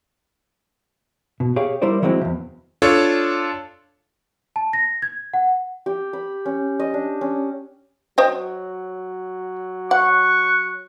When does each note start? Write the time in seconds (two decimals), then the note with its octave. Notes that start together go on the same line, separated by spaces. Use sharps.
1.40 B2
1.56 G4 G#4 C#5 F5
1.82 G3 E4 A#4 C5 D5
2.02 E3 F#3 G#3 C4 E4
2.21 E2 D3
2.82 D4 F4 A4 C#5
4.56 A5
4.73 A#6
5.02 G#6
5.34 F#5
5.86 G4
6.13 B5
6.46 C#4
6.80 D#5
6.94 D4
7.21 C#4
8.18 F#3 C5 D#5 G5
9.91 F#5 C#6 F#6